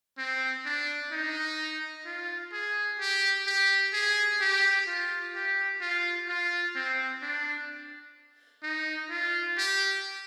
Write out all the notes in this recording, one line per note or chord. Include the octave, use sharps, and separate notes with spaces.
C4
D4
D#4
F4
G#4
G4
G4
G#4
G4
F4
G4
F4
F4
C4
D4
D#4
F4
G4